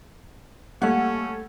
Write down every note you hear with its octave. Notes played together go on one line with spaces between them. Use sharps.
G3 A3 A#3 C#4 F#5